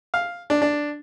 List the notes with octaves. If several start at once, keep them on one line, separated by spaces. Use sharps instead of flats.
F5
D4
D4